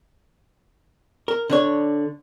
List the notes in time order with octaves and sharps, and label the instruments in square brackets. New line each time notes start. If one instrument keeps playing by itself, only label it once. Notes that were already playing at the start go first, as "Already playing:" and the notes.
[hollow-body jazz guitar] A#4
D3 D4 C#5